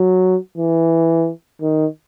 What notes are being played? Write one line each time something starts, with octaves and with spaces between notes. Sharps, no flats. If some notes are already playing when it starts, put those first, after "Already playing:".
Already playing: F#3
E3
D#3